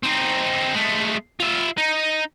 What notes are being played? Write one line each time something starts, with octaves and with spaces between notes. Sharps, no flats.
C4 D#4
G#3 A3
F4 E5
D#4